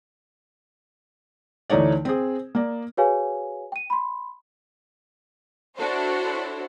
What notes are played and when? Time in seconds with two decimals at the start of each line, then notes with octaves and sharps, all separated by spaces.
1.70 D2 E3 A3 D#4 C#5 D5
2.05 C4 G#4
2.55 A#3 D5
2.97 F#4 G#4 B4 C#5 F5 G#5
3.72 G5 D#7
3.90 B5 C6
5.76 D4 E4 F#4 A4 C5 C#5